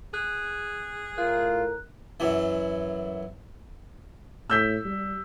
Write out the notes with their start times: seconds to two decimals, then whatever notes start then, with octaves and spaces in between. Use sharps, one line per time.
0.14 G#4 F#6
1.18 A2 F4 A#4 F#6
2.20 F#2 E3
4.50 A2 E6 G6 B6
4.85 G3